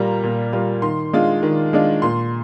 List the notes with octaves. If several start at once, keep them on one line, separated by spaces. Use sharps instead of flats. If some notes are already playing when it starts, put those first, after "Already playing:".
Already playing: A#2 G3 A#3 F4 A#5
A#2
G3 A#3 F4
D#3 C6
G#3 D4 F4
D#3
G#3 D4 F4
A#2 C6